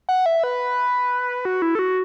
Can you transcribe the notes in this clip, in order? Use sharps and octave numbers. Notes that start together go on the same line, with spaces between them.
F#5
E5
B4
F#4
E4
A4
F#4